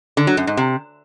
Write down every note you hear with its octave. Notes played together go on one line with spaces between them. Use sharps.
D3
F#3
F#2
G#2
C3